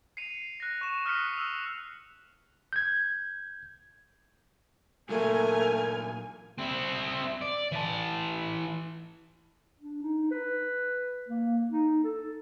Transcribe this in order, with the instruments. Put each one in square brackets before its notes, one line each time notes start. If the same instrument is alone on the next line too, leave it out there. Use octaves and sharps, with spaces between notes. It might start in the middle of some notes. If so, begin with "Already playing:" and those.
[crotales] C7 C#7 D#7 F7
F#6 A#6
C#6 E7
D#6 F6 F#6 A#6 B6 C#7
E6 F7
[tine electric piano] G6 G#6
[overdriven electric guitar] A#2 F#3 [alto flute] A3 [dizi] A#4 [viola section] G#5
[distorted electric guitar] C4 E4
D5
E3 A5
[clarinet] D4
D#4
B4
A#3
D#4
A4